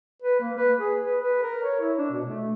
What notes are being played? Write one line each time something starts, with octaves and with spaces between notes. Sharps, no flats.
B4
A#3
B4
G#4
B4
B4
A#4
C#5
E4
D4
B2
A3